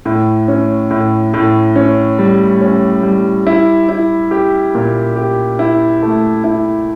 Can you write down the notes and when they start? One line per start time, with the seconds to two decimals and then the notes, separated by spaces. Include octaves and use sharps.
0.05 A2
0.48 C#4
0.90 A2
1.34 A2
1.76 C#4
2.19 G3
2.61 C#4
3.03 G3
3.47 E4
3.89 E4
4.31 G4
4.75 A#2
5.16 G4
5.59 E4
6.02 A3
6.44 E4